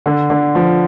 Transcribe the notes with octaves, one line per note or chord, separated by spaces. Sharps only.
D3
D3
F3